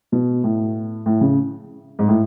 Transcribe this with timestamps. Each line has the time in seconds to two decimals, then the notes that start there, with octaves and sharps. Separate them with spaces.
0.12 B2
0.44 A2
1.06 A2
1.21 C#3
1.99 G#2
2.08 A2